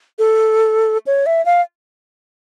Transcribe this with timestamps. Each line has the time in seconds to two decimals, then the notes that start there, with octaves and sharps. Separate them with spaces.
0.19 A4
1.07 C#5
1.26 E5
1.46 F5